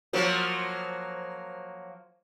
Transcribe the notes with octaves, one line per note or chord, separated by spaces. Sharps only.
F3 F#3 A#3